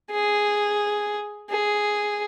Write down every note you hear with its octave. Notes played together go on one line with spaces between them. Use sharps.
G#4
G#4